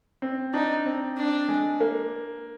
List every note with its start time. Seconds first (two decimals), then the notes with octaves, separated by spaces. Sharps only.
0.22 C4
0.54 D4 D#4
0.86 C4
1.17 D4
1.48 G#3
1.80 A#3